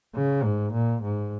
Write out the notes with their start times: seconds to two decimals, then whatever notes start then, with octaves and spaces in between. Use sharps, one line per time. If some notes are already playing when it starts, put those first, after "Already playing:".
0.15 C#3
0.44 G#2
0.73 A#2
1.02 G#2